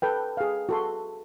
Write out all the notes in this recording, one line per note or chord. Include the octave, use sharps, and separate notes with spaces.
A4 B4 G5
G#4 F5
F#4 A4 C6